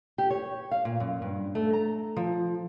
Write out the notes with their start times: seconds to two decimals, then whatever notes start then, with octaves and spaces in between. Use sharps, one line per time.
0.18 G4
0.30 C#5
0.71 F5
0.85 A#2
1.00 F#2
1.22 G2
1.55 A3
1.73 A#5
2.17 F3